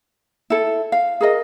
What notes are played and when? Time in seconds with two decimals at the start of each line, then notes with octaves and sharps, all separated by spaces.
0.50 E4 A4
0.92 F5
1.21 G#4 A#4 D#5